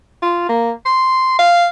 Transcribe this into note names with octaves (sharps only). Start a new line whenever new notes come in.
F4
A#3
C6
F5